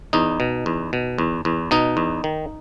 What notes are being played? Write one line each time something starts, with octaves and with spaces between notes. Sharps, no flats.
E2 D#4
B2
E2
B2
E2
E2
B2 D#4
E2
D#3